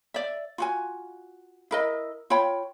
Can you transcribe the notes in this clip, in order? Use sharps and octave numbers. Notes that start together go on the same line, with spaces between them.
D5 E5
F4 F#4 G#5
E4 A#4 D#5
F4 C#5 G5 B5